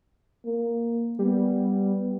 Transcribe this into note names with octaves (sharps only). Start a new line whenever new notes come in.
A#3
G3 B3